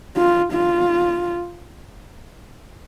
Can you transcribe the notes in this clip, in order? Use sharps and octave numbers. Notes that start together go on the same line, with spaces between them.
F4
F4